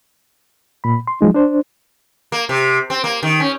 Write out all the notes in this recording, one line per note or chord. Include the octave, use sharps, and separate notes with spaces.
A#2 B5
C6
F3 F#3 G#3 D#4
D4 C5
A#3
C3
C4
A#3
D#3
C#4